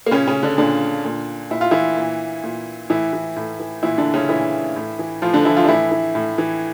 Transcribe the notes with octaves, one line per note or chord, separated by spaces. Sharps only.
A#3
A#2 C#3 C#4
C#3 C#4
D3 D4
A#2 D3 D4
A#2
A#2 E4
F4
E3 E4
A#2
A#2
A2 E3 E4
E3
A2
E3
A#2 E3 E4
D3 D4
C#3 C#4
A#2 E3 E4
A2
E3
A2 F3 F4
D3 D4
E3 E4
F3 F4
D4
A2 E3 E4
E3
A2
E3